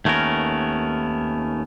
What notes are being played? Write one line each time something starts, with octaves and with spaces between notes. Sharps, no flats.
D#2 A3 B3 C#4 A#4